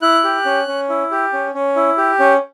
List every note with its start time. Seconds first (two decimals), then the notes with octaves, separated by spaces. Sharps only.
0.02 E4 F#6
0.24 G4
0.45 C#4
0.68 C#4
0.89 E4
1.11 G4
1.33 C#4
1.54 C#4
1.76 E4
1.98 G4
2.20 C#4